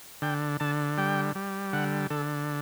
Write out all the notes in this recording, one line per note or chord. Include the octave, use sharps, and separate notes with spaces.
D3 G5
D3 A5
G3 G5
G3
D3 F#5
D3 A4